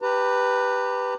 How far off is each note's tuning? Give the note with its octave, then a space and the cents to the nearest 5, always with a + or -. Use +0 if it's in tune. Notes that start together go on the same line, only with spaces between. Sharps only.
G4 +0 B4 +0 A#5 -40